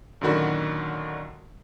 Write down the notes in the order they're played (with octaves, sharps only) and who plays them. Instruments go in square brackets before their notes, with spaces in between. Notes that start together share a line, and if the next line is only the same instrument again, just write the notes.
[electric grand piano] F#2 A#2 D3 D#3 F#4 B5